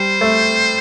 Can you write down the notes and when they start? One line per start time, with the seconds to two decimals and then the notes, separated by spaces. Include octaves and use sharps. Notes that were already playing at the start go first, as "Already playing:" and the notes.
Already playing: G3 C5
0.21 A3